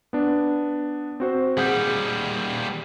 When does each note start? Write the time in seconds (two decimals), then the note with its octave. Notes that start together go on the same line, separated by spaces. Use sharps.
0.13 B3 D4
1.20 C4 F#4 C5
1.57 D#2 G3 G#4 F#5 G6